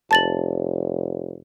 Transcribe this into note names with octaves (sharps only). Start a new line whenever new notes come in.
F1 A5 A6 F#7